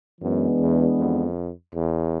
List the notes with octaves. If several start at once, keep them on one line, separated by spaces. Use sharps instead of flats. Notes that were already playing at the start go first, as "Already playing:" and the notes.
F#2 E3 G#3 B3 D4
E2
F2
E2